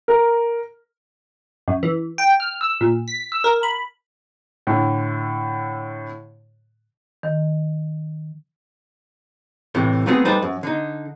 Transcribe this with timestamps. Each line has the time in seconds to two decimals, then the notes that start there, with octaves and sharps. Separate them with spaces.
0.08 A#4
1.68 F#2
1.83 E3
2.18 G5
2.40 F6
2.61 E6
2.81 A#2
3.08 B6
3.32 E6
3.44 A#4
3.63 B5
4.67 A2 D3
7.23 D#3
9.75 A2 C3 E3 A3
10.06 F#3 A3 B3 C4 F#4 G#4
10.25 G3 D#4 A4 B4 C5 D5
10.43 F#2
10.63 D3 D#4